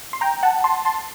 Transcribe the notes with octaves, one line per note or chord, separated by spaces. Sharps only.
C6
G5 A#5
F#5 A5
A5 C6
A5 C6